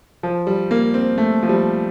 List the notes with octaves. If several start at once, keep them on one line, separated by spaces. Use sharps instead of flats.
F3
G3
A#3
C4
A3
F3
G3